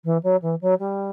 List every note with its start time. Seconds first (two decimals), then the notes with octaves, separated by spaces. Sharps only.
0.04 E3
0.23 F#3
0.42 E3
0.61 F#3
0.79 G3